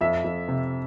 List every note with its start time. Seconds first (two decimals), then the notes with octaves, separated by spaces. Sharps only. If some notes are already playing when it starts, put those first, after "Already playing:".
0.01 F2 E5
0.24 F2
0.48 C3